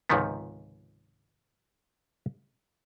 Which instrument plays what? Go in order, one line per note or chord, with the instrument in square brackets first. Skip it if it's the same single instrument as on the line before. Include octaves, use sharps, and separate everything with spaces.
[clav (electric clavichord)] C#2 G#2 C3 D#3 F3 B3